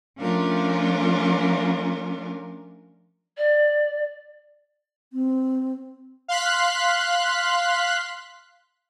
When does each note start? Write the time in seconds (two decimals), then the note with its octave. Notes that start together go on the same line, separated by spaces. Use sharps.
0.19 F3 A3 C#4 D4 F4 A#4
3.38 D5
5.13 C4
6.28 F5 C6 F#6 B6